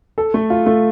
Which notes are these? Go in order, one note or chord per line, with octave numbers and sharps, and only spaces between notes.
A4
A3
F4
A3